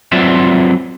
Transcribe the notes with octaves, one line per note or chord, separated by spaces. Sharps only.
F#3 C4 F4 B4 D5 E5